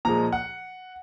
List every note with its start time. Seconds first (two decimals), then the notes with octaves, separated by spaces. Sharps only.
0.05 A#2 F3 G#3 A#5
0.33 F#5